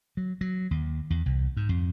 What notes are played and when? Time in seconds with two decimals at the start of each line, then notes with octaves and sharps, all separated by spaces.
0.17 F#3
0.41 F#3
0.71 D#2
1.10 E2
1.26 C2
1.57 G#2
1.69 F2